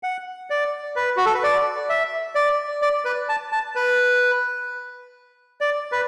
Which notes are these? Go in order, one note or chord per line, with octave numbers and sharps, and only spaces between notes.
F#5
D5
B4
F#4
A4
B4
D5
E5
D5
D5
B4
A5
A5
B4
D5
B4